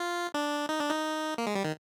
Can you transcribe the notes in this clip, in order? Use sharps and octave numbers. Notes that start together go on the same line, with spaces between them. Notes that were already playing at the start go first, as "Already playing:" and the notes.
Already playing: F4
D4
D#4
D4
D#4
A#3
G#3
G3
D#3